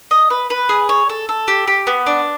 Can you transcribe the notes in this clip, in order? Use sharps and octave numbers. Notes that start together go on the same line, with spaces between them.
D#5
B4
B4
G#4
C#5
A4
A4
G4
G4
B3
D4